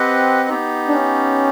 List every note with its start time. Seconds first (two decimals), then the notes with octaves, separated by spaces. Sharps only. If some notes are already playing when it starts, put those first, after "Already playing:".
Already playing: C4 G4 B4 D#5 F#5
0.49 B3 D#4 G4
0.88 D4
0.93 C#4